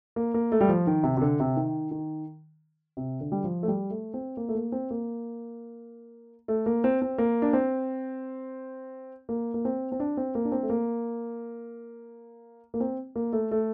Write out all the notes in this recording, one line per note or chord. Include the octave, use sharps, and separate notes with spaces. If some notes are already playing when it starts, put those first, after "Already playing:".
A#3
A#3
A3
G3
F3
D#3
C3
C3
D3
C3
D#3
D#3
C3
D3
G3
F3
A3
G3
A3
C4
A#3
A3
A#3
C4
A#3
A3
A#3
C4
C4
A#3
D4
C4
A#3
A#3
C4
C4
D4
C4
A#3
D4
C4
A3
A#3
A#3
C4
A#3
A3
A3